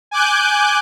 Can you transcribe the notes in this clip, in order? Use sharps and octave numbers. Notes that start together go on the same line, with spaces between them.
G#5 D6 F#6 G6